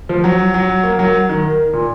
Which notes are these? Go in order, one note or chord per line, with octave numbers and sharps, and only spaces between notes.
F3
F#3
F#3
A#3
F#3
D#3
A#2